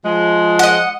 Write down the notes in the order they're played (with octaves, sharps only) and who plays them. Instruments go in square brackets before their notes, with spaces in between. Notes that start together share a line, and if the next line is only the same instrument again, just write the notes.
[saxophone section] F3 G#3
[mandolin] D#5 F#5